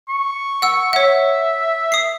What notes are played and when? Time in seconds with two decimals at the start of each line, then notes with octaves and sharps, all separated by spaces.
0.09 C#6
0.62 F#5 E6
0.93 C#5 E5 F#5
1.92 D#6 C7